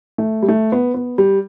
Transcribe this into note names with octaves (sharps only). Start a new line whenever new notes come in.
A3
G3
A3
B3
B3
G3